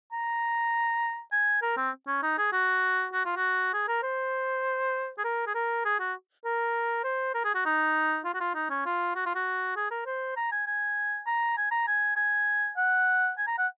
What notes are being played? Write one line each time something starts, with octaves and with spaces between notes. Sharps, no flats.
A#5
G#5
A#4
C4
C#4
D#4
G#4
F#4
F#4
F4
F#4
G#4
A#4
C5
G#4
A#4
G#4
A#4
G#4
F#4
A#4
C5
A#4
G#4
F#4
D#4
F4
F#4
F4
D#4
C#4
F4
F#4
F4
F#4
G#4
A#4
C5
A#5
G#5
G#5
A#5
G#5
A#5
G#5
G#5
F#5
G#5
A#5
F#5